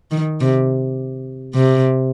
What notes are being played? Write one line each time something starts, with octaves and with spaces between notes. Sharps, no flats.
D#3
C3
C3